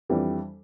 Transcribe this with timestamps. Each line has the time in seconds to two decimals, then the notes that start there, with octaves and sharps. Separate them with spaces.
0.09 F2 E3 G3 D4